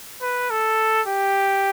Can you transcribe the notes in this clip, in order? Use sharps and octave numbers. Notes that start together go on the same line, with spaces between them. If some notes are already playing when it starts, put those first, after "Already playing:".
B4
A4
G4